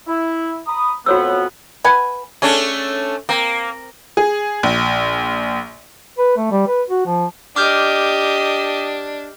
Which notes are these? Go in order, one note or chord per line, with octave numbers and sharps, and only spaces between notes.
E4
A#5 B5 D#6
F2 B3 F#4 C#5 E6
B4 F#5 G#5
A3 C#4 D4 G#4
A#3 C4
G#4
A#1
B4
A3
G3
B4
F#4
F3
D4 G4 D#5 D6 F6 G6